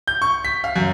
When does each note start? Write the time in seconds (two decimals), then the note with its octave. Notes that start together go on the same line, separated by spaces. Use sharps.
0.07 G6
0.22 C#6
0.44 B6
0.64 F5
0.76 F#2